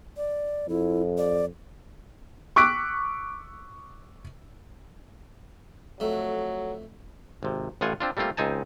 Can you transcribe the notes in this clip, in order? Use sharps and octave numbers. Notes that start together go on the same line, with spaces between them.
D5
F2 E4
D5
C#6 D6 E6 F#6 B6 D7
F2 F#3 A3
G#1 C3
A1 A2 F4 F#5 G#5
C4 D4 F4
G3 A3 A#3 C4 F4
C#2 C4 D#4 G#5 A5